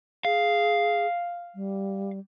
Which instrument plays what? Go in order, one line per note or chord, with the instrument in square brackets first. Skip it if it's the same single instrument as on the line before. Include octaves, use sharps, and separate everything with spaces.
[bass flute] G#4 [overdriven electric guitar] F5
[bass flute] G3